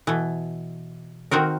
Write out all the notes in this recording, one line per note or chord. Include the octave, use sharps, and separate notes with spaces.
B2 E3
D#3 C4 F#4 A#4